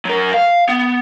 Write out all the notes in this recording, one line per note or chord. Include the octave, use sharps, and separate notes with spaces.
F#3 A#4
F5
B3